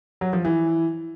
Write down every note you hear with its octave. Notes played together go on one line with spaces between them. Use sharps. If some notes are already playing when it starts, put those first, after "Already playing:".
F#3
F3
E3